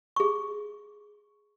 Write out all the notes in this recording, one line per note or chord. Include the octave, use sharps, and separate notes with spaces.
G#4 C#6